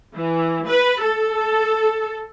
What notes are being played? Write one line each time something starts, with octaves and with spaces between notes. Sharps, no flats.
E3
B4
A4